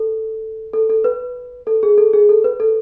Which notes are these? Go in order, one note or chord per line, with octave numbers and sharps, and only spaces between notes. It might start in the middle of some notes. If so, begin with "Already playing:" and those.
Already playing: A4
A4
A4
B4
A4
G#4
A4
G#4
A4
B4
A4